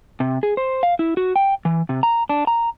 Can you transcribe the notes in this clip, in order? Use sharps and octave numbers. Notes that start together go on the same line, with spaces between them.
C3
G#4
C5
F5
E4
F#4
G5
E3
C3
A#5
D4
A#5